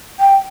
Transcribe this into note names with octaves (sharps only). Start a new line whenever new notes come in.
G5